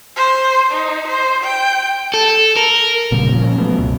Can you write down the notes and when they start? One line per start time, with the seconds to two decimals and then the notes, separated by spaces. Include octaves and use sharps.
0.16 C5
0.72 D#4
1.07 C5
1.43 G5
2.14 A4
2.56 A#4
3.11 F1 A#2 C#3 G3
3.32 A#2 F3 C#4
3.58 F3 F#3 A3 B3
3.78 C#2 F#2 B2